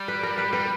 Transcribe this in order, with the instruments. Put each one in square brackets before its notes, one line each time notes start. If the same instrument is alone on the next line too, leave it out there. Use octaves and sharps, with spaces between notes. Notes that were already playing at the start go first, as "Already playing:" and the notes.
Already playing: [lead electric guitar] G3
[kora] B4
A#4
B4
[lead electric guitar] G3 [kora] B4